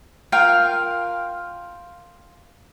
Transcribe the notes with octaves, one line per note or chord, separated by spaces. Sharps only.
F4 A#4 F5 G5